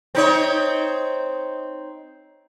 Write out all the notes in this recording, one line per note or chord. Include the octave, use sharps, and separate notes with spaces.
C4 D#4 C#5